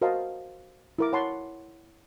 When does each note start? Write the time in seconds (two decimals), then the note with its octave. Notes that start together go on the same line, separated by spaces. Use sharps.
0.01 F#4 A#4 C5 D#5 F5 A5
0.99 E4 A#4 D6
1.13 C#5 F#5 A5 B5 C6